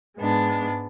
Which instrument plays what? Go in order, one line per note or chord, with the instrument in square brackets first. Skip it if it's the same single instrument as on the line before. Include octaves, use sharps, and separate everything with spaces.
[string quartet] G#2 G#3 B3 D4